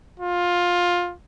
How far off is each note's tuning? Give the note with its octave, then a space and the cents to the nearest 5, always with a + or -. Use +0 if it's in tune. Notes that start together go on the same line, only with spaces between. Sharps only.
F4 +15